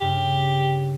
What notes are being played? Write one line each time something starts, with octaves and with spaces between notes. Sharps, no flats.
G2 C#3 G4